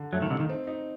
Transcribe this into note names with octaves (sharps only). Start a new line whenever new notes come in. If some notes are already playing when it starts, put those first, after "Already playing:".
Already playing: D3
F#2 F#3 A3
D#2 D#3
C2 C3 D#4
D#2 D#3
C4
D#4